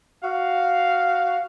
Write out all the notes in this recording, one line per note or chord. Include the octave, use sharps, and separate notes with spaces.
F#4 F5